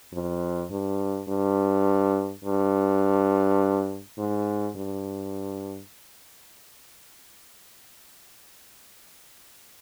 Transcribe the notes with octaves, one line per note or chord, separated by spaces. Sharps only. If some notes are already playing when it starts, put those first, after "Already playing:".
F2
G2
G2
G2
G#2
G2